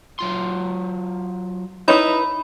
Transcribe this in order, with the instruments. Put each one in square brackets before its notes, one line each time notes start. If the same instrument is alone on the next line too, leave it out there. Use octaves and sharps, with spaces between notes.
[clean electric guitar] F#3 F4 C6
[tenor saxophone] D#4 [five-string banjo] E4 B4 C#5 [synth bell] B5